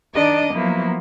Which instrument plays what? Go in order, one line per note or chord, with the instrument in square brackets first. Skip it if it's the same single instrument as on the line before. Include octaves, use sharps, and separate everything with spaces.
[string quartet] D#3 D4 D#5 D6
F3 F#3 A#3 B3 E4